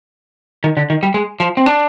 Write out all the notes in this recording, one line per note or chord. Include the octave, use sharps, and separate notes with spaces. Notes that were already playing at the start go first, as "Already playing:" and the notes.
D#3
D3
D#3
G3
G#3
F3
C4
D4